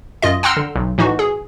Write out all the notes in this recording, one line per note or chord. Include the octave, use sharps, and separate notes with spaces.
F#2 F4 D#5
F#5 G5 A#5 C6 E6 F6
D3
B1
A2 E3 D#4 F#4
G#4